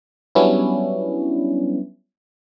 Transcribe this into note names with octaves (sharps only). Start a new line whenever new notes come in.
F#3 G3 B3 C#4 D4 E4